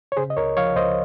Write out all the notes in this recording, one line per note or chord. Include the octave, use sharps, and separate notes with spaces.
C#5
C#3 G#4 C5
D#5
C#2 A#4 C#5
F3 C#5 F5
C#2 C5 D#5